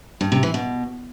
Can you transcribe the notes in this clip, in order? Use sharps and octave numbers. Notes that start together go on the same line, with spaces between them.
G2
C3
E3
B2